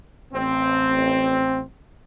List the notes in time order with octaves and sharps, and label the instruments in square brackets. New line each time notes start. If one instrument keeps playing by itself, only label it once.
[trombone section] A1 C4